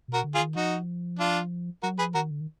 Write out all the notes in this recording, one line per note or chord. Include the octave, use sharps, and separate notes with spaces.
B2
F#4 A#4
D3
F4 G#4
D#3
F3 D#4 F#4
D4 F4
F#3 F#4 A#4
F3 G#4 B4
D#3 F#4 A#4
D3
D#3